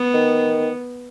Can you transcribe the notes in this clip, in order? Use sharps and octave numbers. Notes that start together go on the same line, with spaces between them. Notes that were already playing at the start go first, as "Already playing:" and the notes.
Already playing: B3
D#3